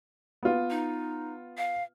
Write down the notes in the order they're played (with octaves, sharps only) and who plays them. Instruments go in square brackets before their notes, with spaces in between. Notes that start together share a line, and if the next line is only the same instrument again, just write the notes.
[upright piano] B3 F4
[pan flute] D#4
F5